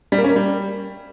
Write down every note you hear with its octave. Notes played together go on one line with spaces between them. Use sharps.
G3
A#3
C#4
A#3
G3